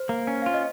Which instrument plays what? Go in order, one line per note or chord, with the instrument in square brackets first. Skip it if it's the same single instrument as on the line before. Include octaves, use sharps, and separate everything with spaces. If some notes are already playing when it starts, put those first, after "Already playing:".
Already playing: [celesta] C5
[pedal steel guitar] A#3
C#4
[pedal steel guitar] F4 [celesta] F5
[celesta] D#5